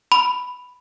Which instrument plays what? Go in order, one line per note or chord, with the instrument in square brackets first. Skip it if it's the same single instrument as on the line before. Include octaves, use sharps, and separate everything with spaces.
[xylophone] B5